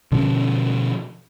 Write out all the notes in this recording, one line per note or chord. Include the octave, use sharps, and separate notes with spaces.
B2 D3 F3 C#4